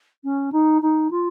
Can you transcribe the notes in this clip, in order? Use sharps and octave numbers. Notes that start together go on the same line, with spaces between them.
C#4
D#4
D#4
F4